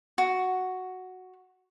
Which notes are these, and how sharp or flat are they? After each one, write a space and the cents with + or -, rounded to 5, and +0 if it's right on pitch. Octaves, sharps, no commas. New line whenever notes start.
F#4 +0